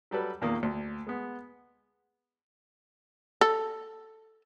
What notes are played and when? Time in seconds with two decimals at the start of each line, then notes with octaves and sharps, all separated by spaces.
0.11 F#3 G3 A4 B4
0.41 E2 A#2 D#3 A#3
0.63 D2
1.07 G#3 B3
3.41 A4